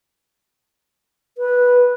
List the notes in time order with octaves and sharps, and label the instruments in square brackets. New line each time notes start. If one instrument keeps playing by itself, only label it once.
[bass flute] B4